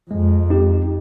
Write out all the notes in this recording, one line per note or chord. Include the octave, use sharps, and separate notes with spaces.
F2 G#3
C4 D#4 G4